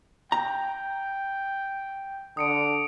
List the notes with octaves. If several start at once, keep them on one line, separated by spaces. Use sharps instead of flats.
G5 A#5
D3 D#6 C#7 D7